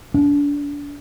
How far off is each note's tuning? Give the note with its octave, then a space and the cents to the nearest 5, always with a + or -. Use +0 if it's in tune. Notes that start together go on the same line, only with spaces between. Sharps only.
D4 -30